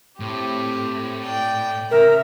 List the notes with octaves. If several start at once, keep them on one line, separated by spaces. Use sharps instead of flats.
A2 C4 G4
D5 G5
C#3 A#4 E5